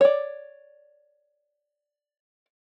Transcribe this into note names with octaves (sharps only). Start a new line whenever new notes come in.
C#5 D5